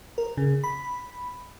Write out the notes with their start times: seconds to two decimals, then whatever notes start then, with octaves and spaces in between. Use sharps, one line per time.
0.18 A#4
0.37 C#3
0.64 B5